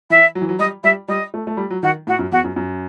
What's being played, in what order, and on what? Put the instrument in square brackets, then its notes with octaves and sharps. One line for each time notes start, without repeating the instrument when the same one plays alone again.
[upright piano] E3 [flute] E5
[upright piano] F#3
E3
F#3
[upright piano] G3 [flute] D#5
[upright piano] G3 [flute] E5
[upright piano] G3 [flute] D#5
[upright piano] A3
A3
G3
F#3
[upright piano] D#3 [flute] F#4
[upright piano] A2 [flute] F#4
[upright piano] F#2
[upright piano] E2 [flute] F#4
[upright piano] F#2
F#2